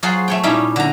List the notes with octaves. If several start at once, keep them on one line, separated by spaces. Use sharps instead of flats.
F#3 F4 G#4 C5 F#5
A3 C#5 G5
A#2 G3 C#4 D#4 E4
D3 A#5